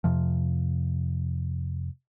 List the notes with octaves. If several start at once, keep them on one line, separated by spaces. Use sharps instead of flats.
F2 C3 F3